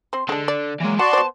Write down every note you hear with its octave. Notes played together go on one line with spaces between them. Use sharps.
C4 C5
D3 G#3 D4
D5
E3 F#3 G#3 A#3
F#4 D5 F#5 A5 C6
B3 C5